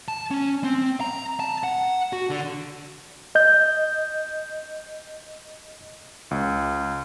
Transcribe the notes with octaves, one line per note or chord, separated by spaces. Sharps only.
A5
C#4
C4
A#5
A5
F#5
F#4
D3
D#5 G6
C#2